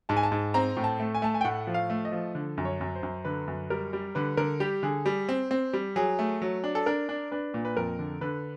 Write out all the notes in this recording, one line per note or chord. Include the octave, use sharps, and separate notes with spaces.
G#2 A5
G#5
A5
G#2
C4 A#5
A2
A5
A3
G#5
A3 A5
G#5
G5
A2 F#5
F3
F5
A3
D#5
F3
D3
F#2
C#5
F#2
C5
F#2
D3 B4
F#2
G3 A#4
G3
D3 B4
D3 A#4
G3 G4
D3 G#4
G3
C4
C4
G3
F#3 G#4
A3
F#3
D4
A4
D4 A#4
D4
D4 B4
A#2
B4
F2 A#4
D3
D3 B4